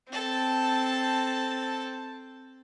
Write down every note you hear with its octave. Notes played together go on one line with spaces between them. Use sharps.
C4 A4 A5